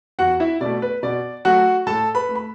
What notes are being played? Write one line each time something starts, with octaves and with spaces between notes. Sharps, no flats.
E2 F#4 F#5
E4 E5
B2 A3 D5
B4
B2 D5
F#3 A3 F#4 F#5
A2 A4 A5
B4 B5
A3
B5